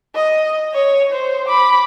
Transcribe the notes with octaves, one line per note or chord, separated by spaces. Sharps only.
D#5
C#5
C5
B5 D6